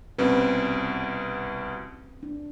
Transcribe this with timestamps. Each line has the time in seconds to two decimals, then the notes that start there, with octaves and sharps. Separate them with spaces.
0.19 C2 B2 C4 C#4 B4
2.23 D4